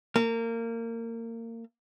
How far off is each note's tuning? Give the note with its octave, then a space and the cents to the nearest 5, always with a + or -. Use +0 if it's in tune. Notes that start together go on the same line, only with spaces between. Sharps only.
A#3 -25